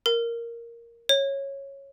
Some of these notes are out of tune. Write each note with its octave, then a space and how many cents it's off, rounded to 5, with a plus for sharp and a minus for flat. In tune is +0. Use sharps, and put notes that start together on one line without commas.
A#4 +0
C#5 -10